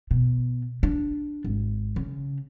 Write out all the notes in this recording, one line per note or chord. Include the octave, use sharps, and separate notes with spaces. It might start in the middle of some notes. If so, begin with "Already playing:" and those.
B2
D4
G#1
C#3